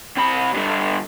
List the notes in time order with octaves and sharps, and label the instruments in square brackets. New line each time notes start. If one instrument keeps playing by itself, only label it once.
[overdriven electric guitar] C3 B5
G2 D3